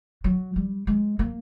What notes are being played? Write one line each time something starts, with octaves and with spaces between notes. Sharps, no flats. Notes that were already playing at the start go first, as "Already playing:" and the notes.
F#3
G3
G#3
A#3